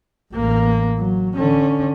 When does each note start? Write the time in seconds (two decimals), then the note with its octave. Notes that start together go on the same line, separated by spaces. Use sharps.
0.33 A1 A#3
0.98 F#3
1.36 D3 C#4